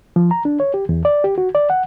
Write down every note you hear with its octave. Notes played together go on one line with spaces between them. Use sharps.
F3
A#5
D4
C#5
G4
E2
D5
G4
F#4
D5
F#5